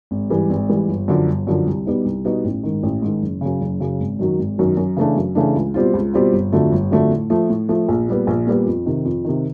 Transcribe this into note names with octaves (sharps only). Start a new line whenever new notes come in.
G#1
G#2 E3 G3
G#1
G#2 E3 G3
G1
F#2 D3 F3
G1
F#2 D3 F3
C2
B2 G3 B3 D#4
C2
B2 G3 B3 D#4
A1
G#2 D#3
A1
G#2 D#3
F#1
F#2 C#3
F#1
F#2 C#3
G#1
F#2 D#3 F#3
G#1
F#2 D#3 F#3
F#2
C#3 E3 A3 D4
F#2
C#3 E3 A3 D4
C#2
B2 G3 C4 F4
C#2
B2 G3 C4 F4
G1
F2 D3 F#3 A3
G1
F2 D3 F#3 A3
A2
F3 A3
A2
F3 A3
A#1
A#2 G3 B3
A#1
A#2 G3 B3
F2
C3 D#3
F2
C3 D#3